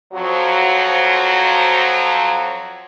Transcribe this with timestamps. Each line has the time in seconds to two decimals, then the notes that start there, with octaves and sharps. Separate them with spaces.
0.13 F2 F3 F#3